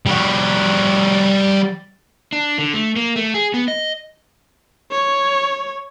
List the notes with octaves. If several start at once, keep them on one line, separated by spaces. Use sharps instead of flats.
G3 F#4
D4
D3
A3
A#3
A3
G#4
B3
D#5
C#5